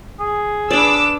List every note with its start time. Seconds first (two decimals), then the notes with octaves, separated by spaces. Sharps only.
0.20 G#4
0.71 D4 B4 D5 D6 E6 E7